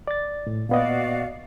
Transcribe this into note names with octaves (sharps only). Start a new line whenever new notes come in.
D5 A6
A2
A#2 B3 F#4 D5 D#5 F5